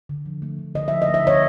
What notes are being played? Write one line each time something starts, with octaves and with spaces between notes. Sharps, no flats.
D3
F3
A3
D3
D3 D#5
F3 E5
D#5
A3
E5
D3 C#5 D#5